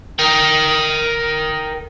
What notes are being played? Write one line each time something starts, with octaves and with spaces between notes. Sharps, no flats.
A#4 G5